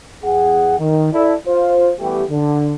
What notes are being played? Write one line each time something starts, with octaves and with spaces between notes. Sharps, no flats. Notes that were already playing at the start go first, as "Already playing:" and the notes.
E2 G#4 F#5
D#3
E4 A4 D5
F4 C5
E3 G3 A3 B3 G4
D3